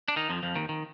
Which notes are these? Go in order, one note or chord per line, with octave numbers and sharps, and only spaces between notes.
D4
D#3 D#4
F2 F3
F2 F3
D#2 D#3
D#3